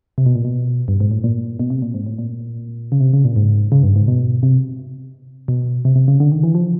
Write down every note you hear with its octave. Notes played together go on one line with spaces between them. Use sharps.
C3
B2
A#2
B2
G2
G#2
A2
A#2
B2
C3
A#2
G#2
A2
A#2
C#3
C3
C#3
A#2
G#2
C#3
G2
G#2
B2
C3
B2
C3
C3
C#3
D3
D#3
E3
F3